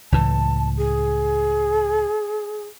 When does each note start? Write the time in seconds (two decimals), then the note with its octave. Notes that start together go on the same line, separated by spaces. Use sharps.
0.12 C#2 A2 E3 A5
0.77 G#4